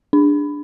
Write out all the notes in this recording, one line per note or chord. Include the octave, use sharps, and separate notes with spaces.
D4